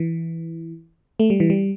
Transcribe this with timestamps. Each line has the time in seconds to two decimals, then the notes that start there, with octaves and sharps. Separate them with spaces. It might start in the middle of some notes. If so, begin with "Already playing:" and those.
Already playing: E3
1.19 A3
1.30 G3
1.40 E3
1.50 G3